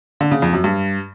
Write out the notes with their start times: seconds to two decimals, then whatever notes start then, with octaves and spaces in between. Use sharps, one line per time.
0.21 D3
0.31 C#3
0.42 F2
0.53 F#2
0.64 G2